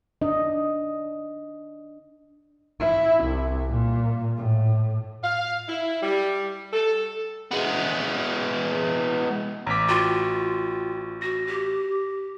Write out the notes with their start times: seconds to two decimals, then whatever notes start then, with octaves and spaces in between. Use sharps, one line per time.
0.22 D4 D#5
2.80 E4
3.25 C2
3.72 A#2
4.37 A2
5.24 F5
5.68 E4
6.02 G3
6.73 A4
7.52 G#3 B3
9.67 A1 A#5 D6 B6
9.89 F4 F#4 G5 C#6
11.22 F#4 A#6
11.47 G4